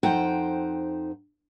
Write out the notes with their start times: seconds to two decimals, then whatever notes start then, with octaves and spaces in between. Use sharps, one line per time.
0.03 F2 D#4 C5 F#5 G5